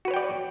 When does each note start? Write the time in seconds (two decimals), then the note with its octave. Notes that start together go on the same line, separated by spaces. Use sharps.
0.05 F#4
0.08 B4
0.11 C#5
0.14 G5
0.16 D5